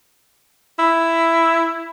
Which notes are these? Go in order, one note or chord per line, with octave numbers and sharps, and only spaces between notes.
E4